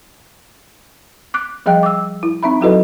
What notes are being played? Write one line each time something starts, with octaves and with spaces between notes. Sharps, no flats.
D6 F#6
F3 G3 G#4 D#5 G5 F#6
D6 E6
E4
C4 D#4 E5 B5
F#3 E4 F#4 A4 B4 D#5